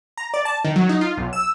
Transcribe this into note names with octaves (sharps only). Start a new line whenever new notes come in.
A#5
D5
A5
D#3
F#3
D#4
F4
B1
E6